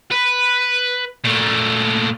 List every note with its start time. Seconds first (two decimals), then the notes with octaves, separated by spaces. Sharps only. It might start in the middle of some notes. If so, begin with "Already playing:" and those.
0.11 B4
1.24 A#2 A3